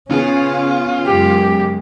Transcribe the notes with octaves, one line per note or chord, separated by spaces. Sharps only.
C#3 B3 C#4 F4 G#4
F#2 G#3 G4